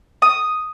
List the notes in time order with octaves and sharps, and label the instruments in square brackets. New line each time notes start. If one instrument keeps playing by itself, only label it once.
[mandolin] D#6